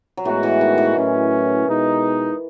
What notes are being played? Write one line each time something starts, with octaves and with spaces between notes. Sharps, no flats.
F#3
A2 E3 G#3 B3 F#4
E3
D#3
E3
A2 F#3 C#4
B2 G#3 D#4